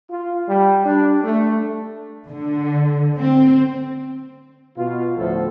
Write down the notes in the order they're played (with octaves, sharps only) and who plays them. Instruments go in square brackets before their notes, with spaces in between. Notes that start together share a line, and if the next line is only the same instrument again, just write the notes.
[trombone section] F4
G3
D4
A3
[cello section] D3
C4
[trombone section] B2 F4
D2 A2 F3 A4 C5